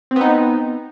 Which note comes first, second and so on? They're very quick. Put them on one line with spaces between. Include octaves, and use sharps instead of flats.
C4 B3 D#4